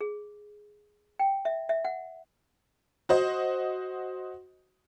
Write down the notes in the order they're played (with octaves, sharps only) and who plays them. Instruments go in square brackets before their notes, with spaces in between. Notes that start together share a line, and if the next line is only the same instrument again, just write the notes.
[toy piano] G#4
G5
E5
E5
F#5
[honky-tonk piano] F#4 C5 D#5